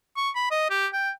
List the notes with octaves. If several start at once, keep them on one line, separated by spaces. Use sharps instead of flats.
C#6
B5
D#5
G4
G5